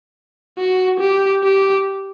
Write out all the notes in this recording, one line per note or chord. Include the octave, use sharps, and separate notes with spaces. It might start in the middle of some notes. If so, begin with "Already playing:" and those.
F#4
G4
G4